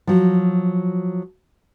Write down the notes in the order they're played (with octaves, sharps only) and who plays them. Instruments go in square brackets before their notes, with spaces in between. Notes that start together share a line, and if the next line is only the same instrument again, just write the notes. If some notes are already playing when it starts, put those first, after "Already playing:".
[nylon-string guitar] F3 F#3